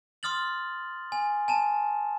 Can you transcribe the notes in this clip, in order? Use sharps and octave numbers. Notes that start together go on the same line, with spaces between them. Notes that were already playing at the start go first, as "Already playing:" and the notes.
C6 D#6 F6 A6 F#7
G#5
G#5 A5 E7